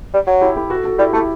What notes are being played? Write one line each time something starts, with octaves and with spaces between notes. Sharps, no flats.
G3
F#3
E4 G4
E4 G4
F#4 A4
F#4 A4
G3 E4 G4
A3 E4 G4